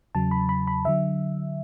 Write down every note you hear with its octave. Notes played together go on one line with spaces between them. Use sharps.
E2 C#3 F#3 A5
B5
B5
B5
D3 F#3 E5